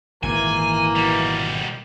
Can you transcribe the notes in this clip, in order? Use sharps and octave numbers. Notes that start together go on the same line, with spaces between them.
G#1 A#2 E3 A#3 G#5
B2 G3